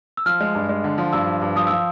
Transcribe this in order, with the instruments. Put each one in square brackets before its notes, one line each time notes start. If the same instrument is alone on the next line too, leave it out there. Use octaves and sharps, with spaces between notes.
[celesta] E6
[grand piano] F3 [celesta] F6
[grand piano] G#3
G2
G#3
D3
F3
[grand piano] G2 [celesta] E6
[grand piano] F3
G2
[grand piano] F3 [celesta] D#6
[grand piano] F3 [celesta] E6